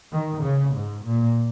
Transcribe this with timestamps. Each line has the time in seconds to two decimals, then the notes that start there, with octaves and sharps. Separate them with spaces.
0.12 D#3
0.42 C#3
0.74 G#2
1.05 A#2